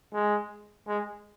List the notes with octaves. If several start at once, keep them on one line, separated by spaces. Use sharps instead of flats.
G#3
G#3